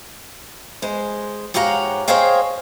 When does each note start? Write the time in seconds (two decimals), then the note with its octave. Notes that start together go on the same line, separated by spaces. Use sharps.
0.82 G#3 C5
1.54 G#2 G4 C#5 F5 F#5 A#5
2.08 G#4 C5 C#5 D#5 F5 G5